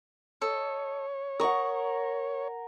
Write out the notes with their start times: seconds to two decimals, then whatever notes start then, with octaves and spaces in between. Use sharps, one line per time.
0.42 A4 C#5 D#5
1.40 A#4 F#5 C#6 D#6